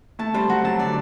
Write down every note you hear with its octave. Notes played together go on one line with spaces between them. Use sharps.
A3 A5
G3 C5
F#3 F#4
F#3 A5
D3 D5